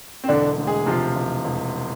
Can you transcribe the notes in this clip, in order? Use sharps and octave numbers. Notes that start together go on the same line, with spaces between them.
C4
E1 D3 D4
D2
G#3 G#4
C3 F3 F4
E1
E1